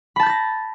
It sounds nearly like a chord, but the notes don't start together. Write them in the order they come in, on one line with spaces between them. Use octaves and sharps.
B5 A5 G6 A6 A#6